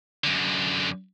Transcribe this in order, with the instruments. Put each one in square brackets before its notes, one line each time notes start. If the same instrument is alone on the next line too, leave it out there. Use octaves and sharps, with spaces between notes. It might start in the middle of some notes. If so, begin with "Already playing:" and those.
[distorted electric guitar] F#2 D3